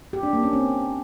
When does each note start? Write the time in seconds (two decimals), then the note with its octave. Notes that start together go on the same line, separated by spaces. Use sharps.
0.13 G4
0.23 D4
0.33 A#3
0.43 C#4
0.53 C4